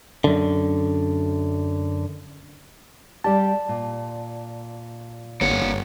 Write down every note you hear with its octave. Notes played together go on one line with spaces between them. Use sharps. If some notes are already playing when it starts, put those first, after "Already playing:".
F#2 D3
G3 G4 D5 A5
A#2
G1 A#3 C#5 F#5